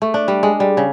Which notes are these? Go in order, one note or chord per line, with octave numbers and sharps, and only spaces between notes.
A3
D4
G3
G#3
G3
C#3